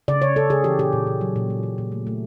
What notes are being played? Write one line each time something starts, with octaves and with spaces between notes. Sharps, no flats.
C#3 D5
C#3 C#5
C#3 A4
C#3 G#4
E3 G4
A#2 G4
A#2
A#2
F#3
A#2
A#3
A#2
A#2
A3
A3